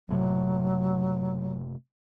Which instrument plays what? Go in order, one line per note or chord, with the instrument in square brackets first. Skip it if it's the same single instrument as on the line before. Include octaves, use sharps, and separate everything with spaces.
[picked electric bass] F#1 A2 C3 [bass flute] F#3